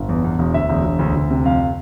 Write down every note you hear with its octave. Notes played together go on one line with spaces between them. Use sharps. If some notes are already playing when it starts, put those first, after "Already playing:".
Already playing: G1
E2
E2
E1
D2 E5
E1
E1
D2
D2
C3
F2 F5